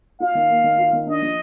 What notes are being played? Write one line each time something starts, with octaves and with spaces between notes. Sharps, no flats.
F4 F5
D#3
A#3
D#3
F4
D#3
D4 D#5
F3